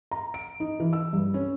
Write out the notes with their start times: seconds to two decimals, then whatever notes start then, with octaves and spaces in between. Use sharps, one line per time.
0.11 A#5
0.34 D7
0.60 D#4
0.80 E3
0.93 E6
1.13 G2
1.34 C#4